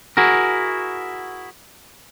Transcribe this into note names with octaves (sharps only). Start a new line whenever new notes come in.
E4 F#4 G#4 A#4